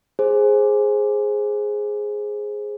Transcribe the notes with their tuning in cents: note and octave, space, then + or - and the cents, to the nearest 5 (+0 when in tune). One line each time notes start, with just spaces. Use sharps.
G#4 +0 C5 +15